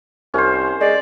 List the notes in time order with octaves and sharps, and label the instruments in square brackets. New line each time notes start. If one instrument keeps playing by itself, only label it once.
[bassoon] C2 [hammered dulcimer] C#4 C5
[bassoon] G#3 [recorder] D5